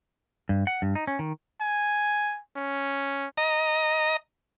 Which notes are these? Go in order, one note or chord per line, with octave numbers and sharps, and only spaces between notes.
G2
F#5
G2
D#4
C#4
D#3
G#5
C#4
D#5 A#5